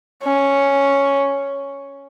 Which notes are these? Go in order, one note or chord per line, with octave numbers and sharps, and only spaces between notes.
C#4